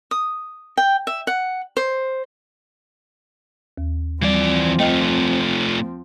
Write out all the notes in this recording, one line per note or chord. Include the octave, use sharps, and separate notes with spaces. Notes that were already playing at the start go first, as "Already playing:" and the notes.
D#6
G5
E5
F#5
C5
D#2
E3 F3 G3 C4 D5
A3 F4 D#5 G5